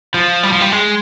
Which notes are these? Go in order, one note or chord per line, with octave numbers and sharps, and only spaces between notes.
F3
G3
F3
G3
G#3